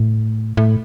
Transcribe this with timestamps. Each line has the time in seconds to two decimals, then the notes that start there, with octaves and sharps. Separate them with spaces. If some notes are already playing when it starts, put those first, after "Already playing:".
Already playing: A2
0.57 A2